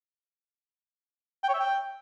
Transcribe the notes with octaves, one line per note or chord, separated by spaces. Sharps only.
G5
C#5
E5
G5